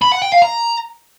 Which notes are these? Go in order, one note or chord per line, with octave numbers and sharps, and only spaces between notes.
B5
F#5
G5
F5
A#5